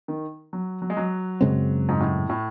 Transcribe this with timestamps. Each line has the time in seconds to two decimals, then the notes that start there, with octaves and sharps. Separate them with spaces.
0.08 D#3
0.53 F#3
0.82 F#3
0.90 G#3
0.97 F#3
1.41 F#2 C#3 G#3 C4
1.89 G#2
2.00 A2
2.30 A2